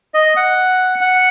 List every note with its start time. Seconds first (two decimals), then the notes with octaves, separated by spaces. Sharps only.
0.14 D#5
0.36 F#5
1.01 F#5